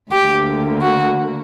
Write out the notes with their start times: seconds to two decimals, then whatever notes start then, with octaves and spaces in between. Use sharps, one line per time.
0.11 D2 D3 A#3 G4
0.82 F#4